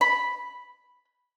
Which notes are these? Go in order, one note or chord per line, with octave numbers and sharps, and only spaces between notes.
B5